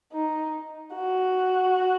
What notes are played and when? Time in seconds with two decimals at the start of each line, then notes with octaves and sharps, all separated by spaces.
0.13 D#4
0.94 F#4